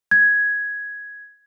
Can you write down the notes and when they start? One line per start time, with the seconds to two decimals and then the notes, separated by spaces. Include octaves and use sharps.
0.11 G#6